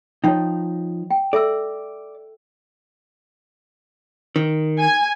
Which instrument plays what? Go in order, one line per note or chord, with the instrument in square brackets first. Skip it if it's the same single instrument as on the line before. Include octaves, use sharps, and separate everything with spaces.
[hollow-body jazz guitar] F3 D#4 [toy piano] C#5 G5
[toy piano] G5
[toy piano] A4 E5 E6 [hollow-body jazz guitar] D5
[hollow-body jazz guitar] D#3
[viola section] G#5